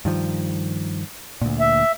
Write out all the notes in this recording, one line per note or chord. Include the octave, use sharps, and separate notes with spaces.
G2 D#3 F3
D2 A#2
E5